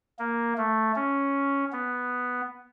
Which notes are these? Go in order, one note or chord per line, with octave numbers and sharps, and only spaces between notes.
A#3
A3
C#4
B3